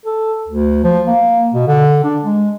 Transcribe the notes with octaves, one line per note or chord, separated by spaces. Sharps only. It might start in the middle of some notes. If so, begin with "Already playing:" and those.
A4
D2
F3
A#3
B2
D3
D4
G#3